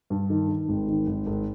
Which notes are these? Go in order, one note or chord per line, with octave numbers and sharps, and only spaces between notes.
G2
D#3
D#3
G#1
D#3
G#1
G#1